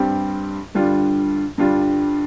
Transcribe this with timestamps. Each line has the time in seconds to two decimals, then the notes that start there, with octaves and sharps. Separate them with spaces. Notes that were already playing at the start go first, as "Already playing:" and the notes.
Already playing: G2 G3 C4 G4
0.75 G2 D3 G3 D4 F4
1.58 G2 D3 G3 D4 F4